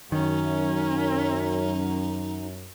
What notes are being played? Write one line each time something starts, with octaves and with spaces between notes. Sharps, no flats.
F#2 D#3 C#4 D#4